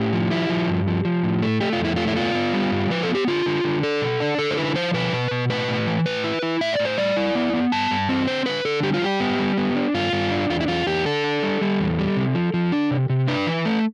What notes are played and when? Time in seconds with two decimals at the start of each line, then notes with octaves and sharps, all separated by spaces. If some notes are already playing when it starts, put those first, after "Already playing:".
Already playing: A2 G4
0.13 F3
0.31 E4
0.49 F3
0.68 G2
0.87 F3
1.05 F3
1.23 A2
1.42 A3
1.61 A3 G4
1.73 F4
1.80 F2
1.85 E4
1.96 A3 F4
2.08 E4
2.16 B3 F4
2.35 B3
2.53 G3
2.71 G2
2.90 F3 B4
3.03 A4
3.09 B3
3.15 G4
3.28 D3 F4
3.46 D3
3.64 D3
3.83 D4 A4
4.01 B2
4.20 D4
4.39 D3 A4
4.50 C5
4.57 E4 B4
4.76 F3 C5
4.94 B2 B4
5.13 B2
5.31 B2
5.50 A2 B4
5.68 A2
5.87 E3
6.06 A2 B4
6.24 E4
6.42 E4
6.61 A2 E5
6.73 D5
6.80 A2
6.85 C5
6.98 G3 D5
7.17 E4
7.35 B3
7.54 B3
7.72 G2 A5
7.91 G2
8.09 C4
8.28 D3 C5
8.46 D3 B4
8.65 D3 A4
8.83 G3 G4
8.94 F4
9.02 G3 G4
9.20 B3
9.39 G3
9.58 B3
9.75 D4
9.94 G2 F4
10.13 G2
10.32 D4
10.50 E2 F4
10.61 E4
10.68 E2 F4
10.87 E2 G4
11.05 D3 A4
11.24 D4
11.43 G3
11.61 G3
11.80 E2
11.99 G3
12.17 C3
12.35 F3
12.54 F3
12.72 D4
12.91 C3
13.10 C3
13.28 D4 B4
13.47 E3
13.65 A3